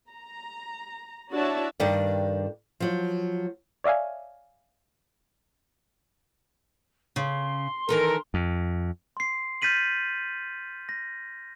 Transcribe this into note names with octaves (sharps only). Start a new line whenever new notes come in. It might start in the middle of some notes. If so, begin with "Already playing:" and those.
A#5
D4 E4 F#4 C#5 E5 A5
G2 D#3 D4 G4 A4 D5
F3 F#3
C#5 D5 E5 F5 G#5
C#3 C6
D#3 E3 A4 A#4
F2
C6 C7
F6 G6 A6 B6 D#7 F#7
A#6